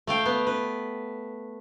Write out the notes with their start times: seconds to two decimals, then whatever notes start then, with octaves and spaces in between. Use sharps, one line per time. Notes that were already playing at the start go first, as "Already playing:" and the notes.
0.07 A3 F5 G5
0.26 B3
0.47 B4